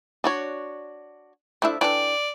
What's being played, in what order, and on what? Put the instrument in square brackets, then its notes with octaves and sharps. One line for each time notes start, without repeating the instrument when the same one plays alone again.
[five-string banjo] D4 F#4 C#5
[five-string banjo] F3 E4 E5 [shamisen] A3 D4
[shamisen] E3 D4 A4 [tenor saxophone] D5 [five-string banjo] G5